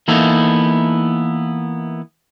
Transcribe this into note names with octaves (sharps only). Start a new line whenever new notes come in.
E3 A#3 B3 D#4 E4 A4